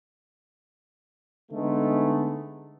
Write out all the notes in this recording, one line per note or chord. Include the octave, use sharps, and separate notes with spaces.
D3 G#3 A3 B3 D#4